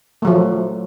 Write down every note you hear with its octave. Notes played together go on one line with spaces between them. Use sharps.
F3 F#3 A3